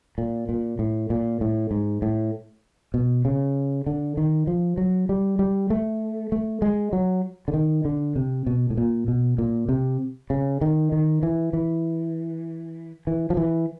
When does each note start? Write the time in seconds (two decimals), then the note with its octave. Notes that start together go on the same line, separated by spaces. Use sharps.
0.18 A#2
0.49 A#2
0.79 A2
1.10 A#2
1.41 A2
1.71 G#2
2.02 A2
2.94 B2
3.25 C#3
3.86 D3
4.17 D#3
4.47 F3
4.78 F#3
5.09 G3
5.39 G3
5.70 A3
6.32 A3
6.62 G#3
6.93 F#3
7.48 D3
7.54 D#3
7.85 D3
8.16 C3
8.47 B2
8.70 A2
8.77 A#2
9.08 B2
9.38 A#2
9.69 C3
10.30 C#3
10.61 D#3
10.92 D#3
11.23 E3
11.53 E3
13.07 E3
13.30 F3
13.37 E3